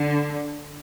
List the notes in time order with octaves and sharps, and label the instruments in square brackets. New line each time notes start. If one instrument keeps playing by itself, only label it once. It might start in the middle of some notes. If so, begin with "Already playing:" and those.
Already playing: [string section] D3